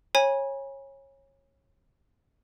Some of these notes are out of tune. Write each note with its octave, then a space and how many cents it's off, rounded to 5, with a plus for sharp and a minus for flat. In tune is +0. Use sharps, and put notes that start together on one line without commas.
C#5 -20 G#5 -20 B5 -35